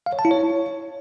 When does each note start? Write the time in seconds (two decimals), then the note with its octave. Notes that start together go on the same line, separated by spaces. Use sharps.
0.06 F5
0.13 C#5
0.19 A5
0.25 E4
0.31 C#5